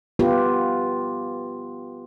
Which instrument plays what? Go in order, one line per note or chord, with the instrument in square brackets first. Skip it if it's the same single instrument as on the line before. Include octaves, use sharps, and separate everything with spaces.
[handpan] B3 F4 G4 B4